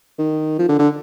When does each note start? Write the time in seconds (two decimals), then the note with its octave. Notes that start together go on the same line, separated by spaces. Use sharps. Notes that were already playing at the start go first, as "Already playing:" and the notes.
0.18 D#3
0.58 F3
0.68 D3
0.79 D3